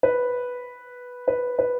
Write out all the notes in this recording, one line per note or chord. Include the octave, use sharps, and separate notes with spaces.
B4
B4
B4